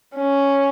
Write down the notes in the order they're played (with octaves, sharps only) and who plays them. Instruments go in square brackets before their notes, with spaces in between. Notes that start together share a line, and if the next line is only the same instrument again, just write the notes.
[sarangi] C#4